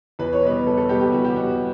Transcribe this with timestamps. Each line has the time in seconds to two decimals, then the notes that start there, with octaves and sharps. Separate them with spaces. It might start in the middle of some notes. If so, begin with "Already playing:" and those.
0.19 E2 B4
0.33 C#5
0.43 B2 G3 B3 B4
0.66 E2 A4
0.78 A4
0.89 B2 G3 B3 G4
1.01 G4
1.12 E2 F#4
1.25 G4
1.36 B2 G3 B3 F#4